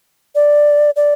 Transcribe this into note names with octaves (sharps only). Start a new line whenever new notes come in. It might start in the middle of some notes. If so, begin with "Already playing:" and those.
D5
D5